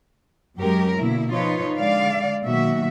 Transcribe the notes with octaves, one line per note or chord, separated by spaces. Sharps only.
F#2 F#3 G#3 C#4 G4 A#4
B2 D3 A#3 E4
F3 D#4 F4 B4 C#5
D3 G#3 D5 F5
B2 D#3 F#3 A#3 F#4 E5